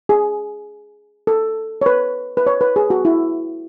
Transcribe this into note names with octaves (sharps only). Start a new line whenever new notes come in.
G#4
A4
C#5
B4
B4
C#5
B4
G#4
F#4
E4